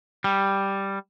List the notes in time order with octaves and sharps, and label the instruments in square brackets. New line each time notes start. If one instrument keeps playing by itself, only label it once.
[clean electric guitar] G3